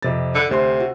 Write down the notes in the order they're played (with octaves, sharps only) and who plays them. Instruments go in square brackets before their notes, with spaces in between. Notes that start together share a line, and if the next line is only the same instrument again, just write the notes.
[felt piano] F2 C3 A6
[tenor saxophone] D3 [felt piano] B5 E6 F#6
[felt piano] D2 C5 C6 [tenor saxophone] C3
[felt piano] F#4